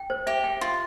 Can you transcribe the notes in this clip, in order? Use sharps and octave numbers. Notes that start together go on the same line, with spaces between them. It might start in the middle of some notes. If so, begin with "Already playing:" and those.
Already playing: G5
C5
G4 E5
G5
F4 C6